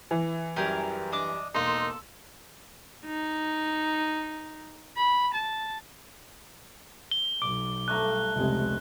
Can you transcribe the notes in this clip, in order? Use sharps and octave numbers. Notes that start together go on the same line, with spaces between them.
E3
F#2 G3 G4 G#4 A#4
D4 D#5 D6
E1 A#3 D#4 A4 C6
D#4
B5
A5
G7
B1 D6
G2 A3 A#5 F#6
F1 C#2 C3 G#3